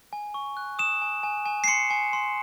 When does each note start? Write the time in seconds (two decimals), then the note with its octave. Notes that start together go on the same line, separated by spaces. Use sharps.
0.13 G#5
0.34 C#6
0.57 F#6
0.79 D#6 E7
1.01 G#5
1.23 G#5
1.46 G#5
1.64 C7
1.68 C6 C#7
1.90 G#5
2.13 C6